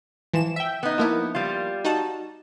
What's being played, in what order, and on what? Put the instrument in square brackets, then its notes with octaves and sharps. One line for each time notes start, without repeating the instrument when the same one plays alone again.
[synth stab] E3 F3 E7
E5 G5
[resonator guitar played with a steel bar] B3 D#4
[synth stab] F3 A#3 E4
[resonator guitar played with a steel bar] G3 F4
[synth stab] D#4 F#4 A5